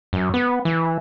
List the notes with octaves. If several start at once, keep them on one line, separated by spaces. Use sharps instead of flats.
F#2
B3
E3